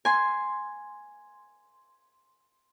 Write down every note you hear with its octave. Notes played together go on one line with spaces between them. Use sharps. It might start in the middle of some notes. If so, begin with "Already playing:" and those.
G#5 C6